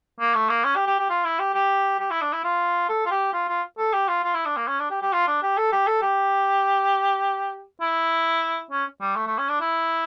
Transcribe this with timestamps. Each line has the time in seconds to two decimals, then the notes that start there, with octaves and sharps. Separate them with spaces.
0.20 A#3
0.35 A3
0.49 A#3
0.64 C#4
0.76 G4
0.87 G4
0.99 G4
1.09 F4
1.25 E4
1.39 G4
1.54 G4
1.99 G4
2.11 E4
2.22 D4
2.33 E4
2.44 F4
2.89 A4
3.06 F4
3.11 G4
3.33 F4
3.48 F4
3.78 A4
3.93 G4
4.08 F4
4.23 F4
4.34 E4
4.46 D4
4.57 A#3
4.68 C#4
4.80 D4
4.90 G4
5.02 G4
5.13 F4
5.27 D4
5.43 G4
5.57 A4
5.72 G4
5.87 A4
6.02 G4
7.81 E4
8.71 C#4
9.01 G3
9.16 A3
9.27 A3
9.38 C#4
9.49 D4
9.61 E4